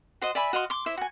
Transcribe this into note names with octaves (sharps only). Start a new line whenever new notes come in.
F#4 C5 D#5
D5 E5 G#5 B5
F#4 D#5 F5 C6
C6 D6
E4 C5 E5
F#4 G#5